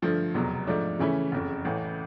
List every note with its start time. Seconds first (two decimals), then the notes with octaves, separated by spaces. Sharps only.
0.02 G2 D3 F3 A3
0.34 F1 E2 B2 F#3
0.67 G#2 F3 A3 D4
0.99 C#3 E3 A3 C#4 E4
1.32 F#1 F2 C#3
1.65 A1 A2 E3